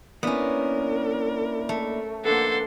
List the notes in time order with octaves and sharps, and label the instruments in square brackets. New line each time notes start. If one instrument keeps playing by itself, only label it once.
[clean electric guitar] A#3 D4 E4 [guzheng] B3 C#4 [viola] A#4
[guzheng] A3
[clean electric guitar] F2 B3 [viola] D3 A#3 [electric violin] A4 C6